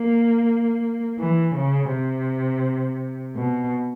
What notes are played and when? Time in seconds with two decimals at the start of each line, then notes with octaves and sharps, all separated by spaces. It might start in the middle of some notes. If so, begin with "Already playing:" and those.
Already playing: A#3
1.19 E3
1.55 C#3
1.92 C3
3.36 B2